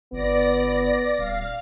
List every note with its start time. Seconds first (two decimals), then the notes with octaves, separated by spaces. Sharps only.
0.12 G1 B3 D5 A#6
1.18 D#1 F5